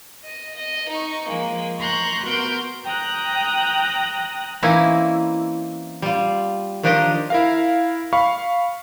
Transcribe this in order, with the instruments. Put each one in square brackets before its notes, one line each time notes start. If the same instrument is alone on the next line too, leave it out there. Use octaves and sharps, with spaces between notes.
[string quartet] D#5
D#5
D#4 C#6
F3 G#3 A#3
A#5 C6 C#6 F#6 G6
B3 F#4 A#4 C6 G6
G5 A#5 D#6 F#6
[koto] E3 A#3 C4 C#4 D#4 E4
G3 F4
D#3 F3 D4 G4 A#4 D#5
[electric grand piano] E4 A#4 F5
F5 B5 C#6